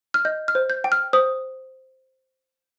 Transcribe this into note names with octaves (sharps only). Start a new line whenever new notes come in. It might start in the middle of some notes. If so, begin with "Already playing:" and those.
F6
D#5 G6
F6
C5
G6
G5
F6
C5 D#6